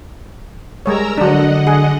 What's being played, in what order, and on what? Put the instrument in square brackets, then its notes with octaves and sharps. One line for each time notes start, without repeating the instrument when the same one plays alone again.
[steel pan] G3 G#3 C#5 [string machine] A#4 A#5 E6
[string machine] D3 D#5 F#5 [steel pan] F#3 D4
[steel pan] G#4